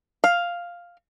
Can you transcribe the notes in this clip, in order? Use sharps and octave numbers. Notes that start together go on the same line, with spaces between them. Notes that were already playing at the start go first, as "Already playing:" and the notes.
F5